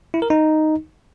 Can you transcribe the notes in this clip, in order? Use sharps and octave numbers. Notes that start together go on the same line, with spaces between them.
E4
A#4
D#4